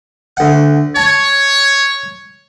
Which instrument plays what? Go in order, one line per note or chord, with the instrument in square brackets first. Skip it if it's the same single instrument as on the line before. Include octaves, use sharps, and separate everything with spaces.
[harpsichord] D2 F#5
[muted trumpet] C#5 [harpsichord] A5